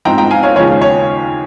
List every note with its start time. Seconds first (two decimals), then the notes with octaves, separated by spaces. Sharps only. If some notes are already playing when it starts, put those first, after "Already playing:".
0.05 G#2 F3 G#3 C4 G5 A#5
0.18 G5 A#5
0.31 F5 G#5
0.43 C#5 F5
0.56 D#2 C#3 F3 G#3 C#4 C#5 F5
0.82 C#5